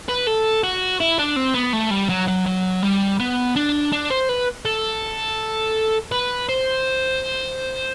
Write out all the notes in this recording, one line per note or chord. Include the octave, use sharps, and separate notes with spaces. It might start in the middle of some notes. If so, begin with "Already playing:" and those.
B4
A4
F#4
E4
D4
C4
B3
A3
G3
F#3
F#3
F#3
G3
B3
D4
D4
C5
B4
A4
B4
C5